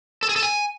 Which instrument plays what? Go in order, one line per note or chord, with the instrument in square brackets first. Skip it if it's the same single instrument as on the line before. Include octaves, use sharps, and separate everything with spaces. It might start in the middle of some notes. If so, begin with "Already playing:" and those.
[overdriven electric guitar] A4
G#4
A4
G#5